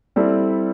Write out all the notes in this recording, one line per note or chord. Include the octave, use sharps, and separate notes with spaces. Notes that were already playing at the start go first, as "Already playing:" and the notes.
G3 C4 E4 A4